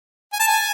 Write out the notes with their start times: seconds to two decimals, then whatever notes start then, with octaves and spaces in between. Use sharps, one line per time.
0.33 G#5
0.40 A5
0.47 G#5